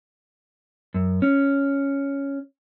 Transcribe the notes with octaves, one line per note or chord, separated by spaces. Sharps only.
F#2
C#4